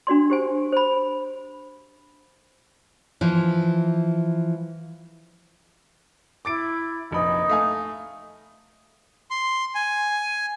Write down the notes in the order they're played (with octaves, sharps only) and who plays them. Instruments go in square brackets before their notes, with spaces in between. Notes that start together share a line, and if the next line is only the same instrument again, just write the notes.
[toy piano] D4 F#4 D5 C6
G4 C5 G#5
C5 B5
[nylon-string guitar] E3 F3
[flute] E4 [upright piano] D6 A6 D7
[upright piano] F1 A#1 B5 [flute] D#4
[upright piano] A3 F5 G#5
[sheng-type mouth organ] C6
G#5